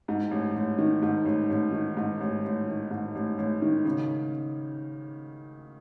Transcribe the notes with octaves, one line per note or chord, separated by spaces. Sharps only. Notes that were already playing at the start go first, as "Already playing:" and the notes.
G#2
A1
A1
D#3
G#2
A1
A1
D#3
G#2
A1
A1
D#3
G#2
A1
A1
D#3
C#3